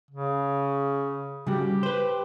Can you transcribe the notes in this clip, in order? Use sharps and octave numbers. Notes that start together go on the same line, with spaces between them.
C#3
C#3 G3 F#4 G4
B4 C5